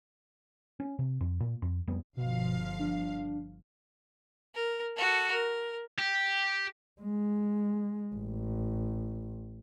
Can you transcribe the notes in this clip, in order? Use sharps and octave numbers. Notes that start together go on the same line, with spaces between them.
C#4
C3
F2
A#2
F2
F2 G3 B3
G1 B2 F3 F5
D4
A#4
F#4 A4
A#4
G4
G#3
A1